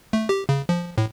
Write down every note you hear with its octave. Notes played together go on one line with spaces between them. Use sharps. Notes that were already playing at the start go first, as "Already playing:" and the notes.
A3
G4
C#3
F3
A2